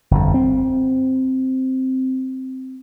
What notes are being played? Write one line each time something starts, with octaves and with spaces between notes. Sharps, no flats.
G1 F2
C4